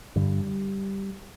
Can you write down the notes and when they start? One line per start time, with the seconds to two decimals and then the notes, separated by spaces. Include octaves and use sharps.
0.16 G2 D3 G3